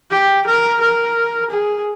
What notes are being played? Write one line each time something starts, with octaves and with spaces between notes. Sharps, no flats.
G4
A#4
A#4
G#4